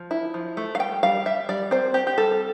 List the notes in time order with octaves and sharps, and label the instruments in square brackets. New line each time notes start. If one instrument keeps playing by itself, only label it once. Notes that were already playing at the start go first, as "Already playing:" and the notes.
Already playing: [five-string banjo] F3
E4
F3
A3
F5
G3 G5
G3 F5
G3 E5
G3 D5
C4 C5
C4 G4
G4
G3 A4